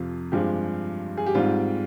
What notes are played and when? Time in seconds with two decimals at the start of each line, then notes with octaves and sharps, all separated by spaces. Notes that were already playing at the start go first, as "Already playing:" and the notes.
Already playing: F2 C3 F3 F4
0.32 G2 F3 G#3 C4 G4
1.17 G#4
1.26 G4
1.35 G#2 G3 C4 F4